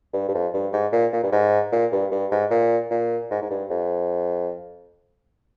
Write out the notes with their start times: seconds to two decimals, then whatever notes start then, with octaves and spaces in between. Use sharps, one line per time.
0.14 G2
0.28 G2
0.34 F2
0.54 G2
0.73 G#2
0.92 A#2
1.13 A#2
1.23 G2
1.33 G#2
1.72 A#2
1.93 G2
2.12 G2
2.32 G#2
2.51 A#2
2.91 A#2
3.31 G#2
3.42 G#2
3.50 G2
3.70 F2